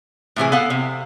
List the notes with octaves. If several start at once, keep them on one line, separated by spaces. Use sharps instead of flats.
A2 C3 E3 G#4
B3 A4 F5 F#5
C3